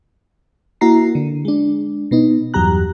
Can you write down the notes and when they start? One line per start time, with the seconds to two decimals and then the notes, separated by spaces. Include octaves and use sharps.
0.81 A#3 E4 F#4 A#5 C7
1.15 D3
1.45 G#3 D4
2.11 B2 B3 D#4
2.54 E2 G2 F#3 G4 A#5 F#6